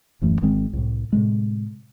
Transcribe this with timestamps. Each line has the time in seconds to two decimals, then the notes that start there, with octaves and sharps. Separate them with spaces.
0.22 D#1 F#2 E3 A3
0.42 G#1 D#3 G#3 C4
0.73 C2 A2
1.13 A2 C3 G#3